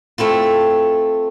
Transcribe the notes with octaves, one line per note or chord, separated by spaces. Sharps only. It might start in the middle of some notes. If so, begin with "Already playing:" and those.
A3 C4 E4 F4